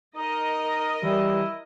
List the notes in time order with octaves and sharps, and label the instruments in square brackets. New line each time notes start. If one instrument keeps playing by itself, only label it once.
[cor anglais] D#4 [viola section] A#4 D#5
[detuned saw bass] E3 [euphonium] G3 [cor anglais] E4